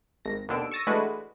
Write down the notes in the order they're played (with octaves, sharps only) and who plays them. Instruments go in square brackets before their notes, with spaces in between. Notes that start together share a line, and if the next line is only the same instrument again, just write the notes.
[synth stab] G#1 A#6
D#2 B2 D3 E6 D7
C#6 E6 A6 A#6 D#7
E3 G#3 A3 D4 F#4 B4